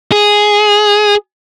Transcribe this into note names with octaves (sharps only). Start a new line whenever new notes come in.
G#4